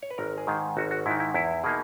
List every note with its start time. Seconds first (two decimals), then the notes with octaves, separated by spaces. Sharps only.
0.02 C#5
0.11 B4
0.18 G#1 A#4
0.38 G#4
0.47 G#2 D#3
0.77 G#1 F#4
0.91 F#4
1.06 G#2 D#3 E4
1.20 E4
1.34 E2 E4
1.64 B2 A#3 D#4 G#4